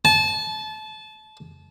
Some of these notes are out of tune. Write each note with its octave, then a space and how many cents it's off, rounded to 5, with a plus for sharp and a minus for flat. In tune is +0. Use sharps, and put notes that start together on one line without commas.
A5 -25